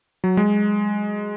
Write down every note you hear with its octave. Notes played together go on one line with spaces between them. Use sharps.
F#3
G#3